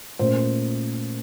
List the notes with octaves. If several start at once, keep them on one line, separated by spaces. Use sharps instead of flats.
A#2 A3 C#4 C5